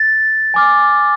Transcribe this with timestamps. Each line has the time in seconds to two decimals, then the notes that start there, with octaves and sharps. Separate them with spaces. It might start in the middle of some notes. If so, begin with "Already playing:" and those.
Already playing: A6
0.54 G#5 D6 F6